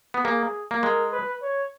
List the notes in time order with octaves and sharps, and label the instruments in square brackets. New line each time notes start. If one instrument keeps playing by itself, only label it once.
[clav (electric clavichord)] B3
[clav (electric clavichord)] A#3 [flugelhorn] G#4
[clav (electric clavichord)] A#3
[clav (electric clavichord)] G#3 [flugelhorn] A#4
[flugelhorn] B4
C#5